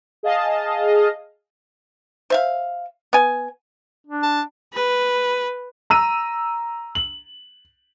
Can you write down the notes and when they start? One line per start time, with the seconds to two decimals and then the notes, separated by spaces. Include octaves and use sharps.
0.23 G#4 D#5 F5 A5
2.30 C5 E5 F5
3.13 B3 G#5
4.07 D4
4.23 A5
4.73 B4
5.90 A#5 E6 D#7
6.95 F#7